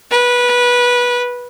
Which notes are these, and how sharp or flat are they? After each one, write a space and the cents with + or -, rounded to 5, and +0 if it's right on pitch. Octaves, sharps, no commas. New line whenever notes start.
B4 -20